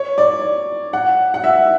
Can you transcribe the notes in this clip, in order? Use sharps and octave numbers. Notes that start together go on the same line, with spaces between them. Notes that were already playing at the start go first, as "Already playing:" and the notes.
Already playing: C#5
D5
F#5
F#5
E5